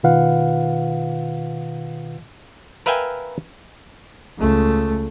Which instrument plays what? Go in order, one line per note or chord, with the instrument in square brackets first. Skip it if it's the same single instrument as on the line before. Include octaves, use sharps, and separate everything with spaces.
[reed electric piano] B2 D#3 F4 B4 F5 F#5
[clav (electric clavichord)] A#4 B4 E5 F5 G5 G#5
[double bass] C#2 A3